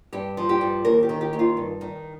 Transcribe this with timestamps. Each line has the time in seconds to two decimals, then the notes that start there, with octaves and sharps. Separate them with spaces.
0.13 G2 G4
0.37 F3
0.49 G4
0.61 G2
0.85 D#2 A#4
1.03 G4
1.09 D#3
1.21 G4
1.33 D#2 G4
1.39 F4
1.57 G2
1.81 D#3